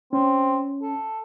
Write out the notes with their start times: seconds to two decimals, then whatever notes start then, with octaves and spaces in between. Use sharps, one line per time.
0.13 C4 C#4
0.82 A4